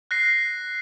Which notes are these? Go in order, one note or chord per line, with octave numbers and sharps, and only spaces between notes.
F#6 A#6 C7